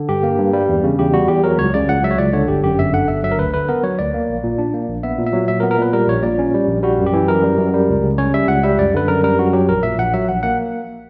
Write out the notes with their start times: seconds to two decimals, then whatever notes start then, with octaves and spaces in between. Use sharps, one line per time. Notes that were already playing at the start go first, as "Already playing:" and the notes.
Already playing: D3
0.09 G2 G4
0.23 A#3
0.39 G2
0.53 G3
0.69 E2
0.84 C#3
0.98 E2 G4
1.13 G3 F#4
1.28 E2 G4
1.44 F#3 A#4
1.58 C#2 C#5
1.74 C#3 D5
1.89 C#2 F#5
2.03 F#3 E5
2.11 C#5
2.18 C#2 D5
2.33 D3 C#5
2.48 G1 G4
2.64 F#2 G4
2.79 G1 E5
2.93 D3 F#5
3.08 G1 E5
3.23 F#3 E5
3.31 A#4
3.38 D2 B4
3.54 D3 B4
3.69 B3 A#4
3.84 F#3 C#5
3.99 D2 D5
4.14 A#3
4.29 A#1
4.44 A#2
4.58 D4
4.74 A#3
4.89 A#1
5.03 B3 E5
5.19 A#2
5.26 E5
5.33 F#3
5.48 A#2 E5
5.60 A#4
5.63 B3
5.71 A#4
5.79 A#2 B4
5.93 G3 A#4
6.08 A#1 C#5
6.23 A#2 D5
6.39 C#4
6.54 G3
6.68 A#1
6.83 G3 F#4
6.99 F#2
7.06 G4
7.13 E3
7.28 F#2 A#4
7.43 G3
7.58 F#2
7.74 G3
7.89 C#2
8.04 C#3
8.18 C#4 C#5
8.34 G3 E5
8.48 C#2 F#5
8.63 G3 E5
8.78 F#2 D5
8.94 D3 B4
9.08 F#2 A#4
9.24 G3 A#4
9.39 F#2 F#4
9.53 F#3 G4
9.69 A#1 A#4
9.83 A#2 E5
9.98 A#1 F#5
10.14 F#3 E5
10.28 A#1 F#5
10.43 A#3 F#5